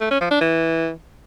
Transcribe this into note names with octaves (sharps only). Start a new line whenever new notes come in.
A3
C#4
F3
D4
E3